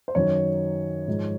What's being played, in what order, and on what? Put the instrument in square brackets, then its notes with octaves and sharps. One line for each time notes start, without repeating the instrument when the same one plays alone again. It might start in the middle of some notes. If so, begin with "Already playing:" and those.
[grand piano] C5
F#2 D#3 F#3 C#5
G#2 F3